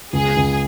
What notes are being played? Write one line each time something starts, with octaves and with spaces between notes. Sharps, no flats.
C#2 G#4
C#2